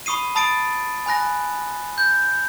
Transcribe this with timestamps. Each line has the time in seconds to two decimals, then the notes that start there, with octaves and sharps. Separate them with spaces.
0.06 B5 C#6 D#6 C7 D#7
0.35 A5 B5 D#6 A6 C7 D7
1.06 G#5 B5 F#6 A#6
1.98 G6